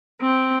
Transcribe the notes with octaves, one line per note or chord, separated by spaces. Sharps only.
C4